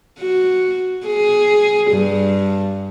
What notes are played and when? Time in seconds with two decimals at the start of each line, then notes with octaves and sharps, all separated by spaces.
0.19 F#4
1.07 G#4
1.91 G2